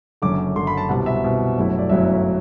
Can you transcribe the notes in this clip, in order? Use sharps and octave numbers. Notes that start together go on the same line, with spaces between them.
F#1 F#2 D3 D6
F#1 F#2 D3 C6
B5
A5
C2 B2 G3 C4 F#5
E5
C2 B2 G3 C4
G1 F#2 F#3 A3 E4
D5
G1 F#2 F#3 A3 E4 E5